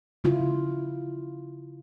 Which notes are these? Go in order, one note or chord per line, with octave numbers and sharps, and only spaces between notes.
C#3 E4 F4